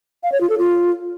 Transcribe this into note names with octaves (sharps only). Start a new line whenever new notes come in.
F5
C#5
F4
A4
F4